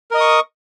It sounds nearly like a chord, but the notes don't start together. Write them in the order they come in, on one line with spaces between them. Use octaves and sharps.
A#4 D#5 D#6 C#6